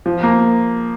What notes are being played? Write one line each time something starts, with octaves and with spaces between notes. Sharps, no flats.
F3
A#3